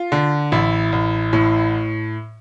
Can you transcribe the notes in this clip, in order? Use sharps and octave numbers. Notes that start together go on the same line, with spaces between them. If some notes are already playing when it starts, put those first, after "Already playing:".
Already playing: F4
D3
A1 E4
A1
A2